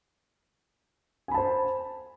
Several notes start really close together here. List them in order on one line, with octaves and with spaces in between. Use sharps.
G#5 B5 A5 C5